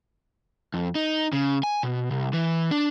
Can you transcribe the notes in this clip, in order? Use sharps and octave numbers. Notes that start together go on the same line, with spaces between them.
F2
D#4
C#3
G#5
B2
C2
E3
D4